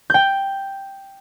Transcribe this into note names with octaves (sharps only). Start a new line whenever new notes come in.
G5 G6